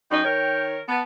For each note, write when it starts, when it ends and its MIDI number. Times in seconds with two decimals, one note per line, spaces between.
0.11 0.22 42
0.11 0.22 63
0.11 0.63 79
0.25 0.79 51
0.25 0.79 70
0.25 0.79 73
0.89 1.01 59
0.89 1.03 81